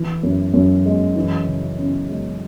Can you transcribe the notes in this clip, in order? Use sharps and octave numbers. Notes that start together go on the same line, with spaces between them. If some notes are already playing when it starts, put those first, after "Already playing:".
Already playing: E3
F#2
F#2
G#3
E3
C#3
C#4
G#3